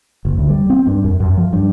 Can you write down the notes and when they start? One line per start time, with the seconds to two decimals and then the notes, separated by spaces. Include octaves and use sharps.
0.25 F#1
0.38 D2
0.50 G3
0.70 C4
0.87 G2
1.04 F#2
1.20 F#2
1.37 F3
1.53 G2